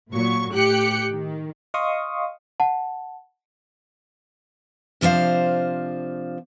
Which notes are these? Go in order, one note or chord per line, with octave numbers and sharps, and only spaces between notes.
A#2 F#3 C#6
A2 G4 G5 F#6 C#7
D#3
D#5 F5 C6 C#6 D#6
F#5 A5
C3 F3 D4 C5 F5